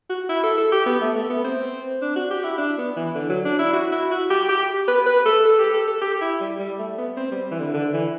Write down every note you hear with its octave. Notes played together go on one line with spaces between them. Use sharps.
F#4
E4
A4
A4
G4
B3
A3
A3
B3
C4
D4
F#4
G4
E4
D4
B3
E3
D3
F#3
D4
E4
F#4
E4
F#4
G4
G4
B4
B4
A4
A4
G4
A4
A4
G4
E4
G3
G3
A3
B3
C4
G3
E3
D3
D3
E3